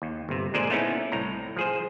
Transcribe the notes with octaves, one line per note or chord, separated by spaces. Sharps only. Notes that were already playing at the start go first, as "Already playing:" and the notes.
D#2
G1 C3
A#2 D3 G#3 C5 D5 G#5
A3 B3 C#4 D#4 E4
C2 A2 A#5
F3 G#4 C5